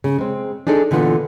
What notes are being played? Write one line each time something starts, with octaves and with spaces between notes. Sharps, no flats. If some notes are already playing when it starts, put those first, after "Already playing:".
C#3
G#3 C4
D4 D#4 G#4 A4 D5
A#2 D3 E3 B3 F4